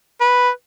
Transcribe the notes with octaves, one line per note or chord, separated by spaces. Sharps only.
B4